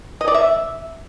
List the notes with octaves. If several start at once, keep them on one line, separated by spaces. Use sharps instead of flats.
D#5
D5
E5